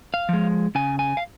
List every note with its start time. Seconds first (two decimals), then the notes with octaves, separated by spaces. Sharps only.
0.14 F5
0.29 F3 G#3
0.75 C#3 G#5
0.99 G#5
1.17 F5